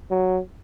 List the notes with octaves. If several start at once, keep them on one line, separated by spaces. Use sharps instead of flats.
F#3